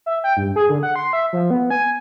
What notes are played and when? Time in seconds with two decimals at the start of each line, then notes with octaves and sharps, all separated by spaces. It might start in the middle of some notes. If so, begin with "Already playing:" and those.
0.06 E5
0.24 G5
0.37 G2
0.56 G#4
0.70 D3
0.83 F#5
0.96 C6
1.13 E5
1.33 F3
1.50 B3
1.70 G#5